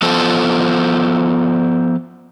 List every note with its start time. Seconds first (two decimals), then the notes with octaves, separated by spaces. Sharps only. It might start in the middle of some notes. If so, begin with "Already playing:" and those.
0.02 F3 B3 F4 A4 C5 A5